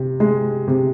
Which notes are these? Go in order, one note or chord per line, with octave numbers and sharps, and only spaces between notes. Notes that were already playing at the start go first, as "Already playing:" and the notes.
Already playing: C3
G#3
C3